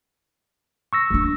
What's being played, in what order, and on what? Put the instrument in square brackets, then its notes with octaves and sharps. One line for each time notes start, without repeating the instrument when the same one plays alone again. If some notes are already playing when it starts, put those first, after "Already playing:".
[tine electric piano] C#6 E6 A#6
[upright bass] D#2 D4